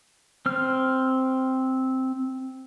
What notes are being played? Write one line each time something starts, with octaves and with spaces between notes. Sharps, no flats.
C4 F6